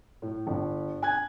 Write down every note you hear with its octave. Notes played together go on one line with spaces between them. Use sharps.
A2
G1
G#5 F#6 G#6